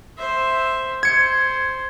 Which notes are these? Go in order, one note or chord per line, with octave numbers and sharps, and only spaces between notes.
C5 E5
C5 G#6 C#7